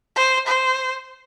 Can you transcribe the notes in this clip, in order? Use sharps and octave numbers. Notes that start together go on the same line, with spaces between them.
C5
C5